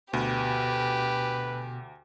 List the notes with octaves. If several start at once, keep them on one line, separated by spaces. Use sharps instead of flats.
D2 B2 G4 B4